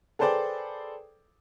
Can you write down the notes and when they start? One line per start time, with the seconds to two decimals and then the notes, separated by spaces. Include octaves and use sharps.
0.19 G#4 A4 B4 C5 D5 G5